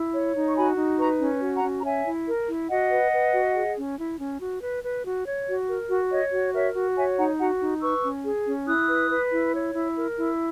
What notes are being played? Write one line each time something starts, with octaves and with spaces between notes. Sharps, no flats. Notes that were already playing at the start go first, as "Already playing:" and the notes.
Already playing: E4
C#5
D#4
C#6
F#4 G#5 B5
D#4
B4 A#5 C#6
C#4
F#4
F#5 A#5
C#4
A#5
C#5 E5 G#5
E4
A#4
E4
F#4 D#5 F#5
B4
B4
F#4
G#4
C#4
E4
C#4
F#4
B4
B4
F#4
C#5
F#4
A#4
F#4
C#5 D#5
F#4
A#4 C#5 E5
F#4
C#5 E5 G#5
D#4 F#5 A#5
F#4 F#5 A#5
D#4
B4 C#6 E6
C#4
G#4
C#4
E4 D#6 F#6
B4
B4
E4
C#5
E4
A#4
E4